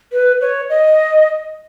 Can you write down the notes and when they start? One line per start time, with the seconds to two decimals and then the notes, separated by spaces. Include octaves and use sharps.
0.12 B4
0.40 C#5
0.69 D#5